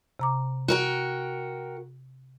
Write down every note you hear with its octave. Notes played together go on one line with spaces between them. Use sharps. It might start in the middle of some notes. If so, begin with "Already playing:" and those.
C3 A#5 D6
F#4 A#4 G5